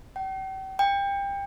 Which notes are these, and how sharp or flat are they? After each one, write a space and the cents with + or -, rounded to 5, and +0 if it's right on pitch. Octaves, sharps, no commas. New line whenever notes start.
G5 -40
G5 +25